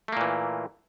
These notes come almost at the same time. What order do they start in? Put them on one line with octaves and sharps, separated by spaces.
A3 A#3 A#2 E3